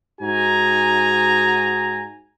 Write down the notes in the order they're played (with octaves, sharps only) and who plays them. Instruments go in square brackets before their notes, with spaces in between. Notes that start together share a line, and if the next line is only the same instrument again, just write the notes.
[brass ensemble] G#2 D#4 F#4 G#5 A#5